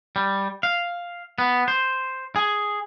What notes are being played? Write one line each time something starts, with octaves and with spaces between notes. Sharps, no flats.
G3
F5
B3
C5
G#4